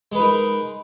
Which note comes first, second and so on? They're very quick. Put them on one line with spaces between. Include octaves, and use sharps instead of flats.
G#3 B4 D#4 A#4